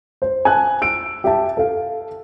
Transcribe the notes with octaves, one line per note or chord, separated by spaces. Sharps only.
C5
G#5 A5 F#6
E6 D7
G4 E5 A5
A4 F5